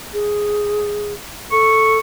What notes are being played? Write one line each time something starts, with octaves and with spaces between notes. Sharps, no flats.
G#4
A4 C#6